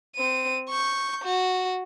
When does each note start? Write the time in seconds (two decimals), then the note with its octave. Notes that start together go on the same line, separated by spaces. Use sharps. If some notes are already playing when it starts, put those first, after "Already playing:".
0.16 C4 D#7
0.69 C#6 G6
1.25 F#4